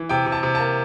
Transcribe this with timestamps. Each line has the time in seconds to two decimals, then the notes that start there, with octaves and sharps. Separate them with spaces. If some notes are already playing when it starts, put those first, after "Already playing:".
Already playing: E3
0.09 C3 G5
0.26 C3
0.32 A5
0.43 C3
0.55 A5
0.60 A#3